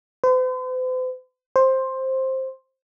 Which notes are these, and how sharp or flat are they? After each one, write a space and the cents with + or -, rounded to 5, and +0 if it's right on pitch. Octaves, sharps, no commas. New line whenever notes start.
C5 -45
C5 +10